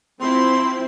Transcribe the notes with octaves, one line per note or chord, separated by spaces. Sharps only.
F3 C4 E4 C6